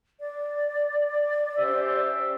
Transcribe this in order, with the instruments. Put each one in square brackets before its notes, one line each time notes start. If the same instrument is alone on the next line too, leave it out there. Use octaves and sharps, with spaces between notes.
[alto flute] D5
[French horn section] C#4 G4 C5 [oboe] E5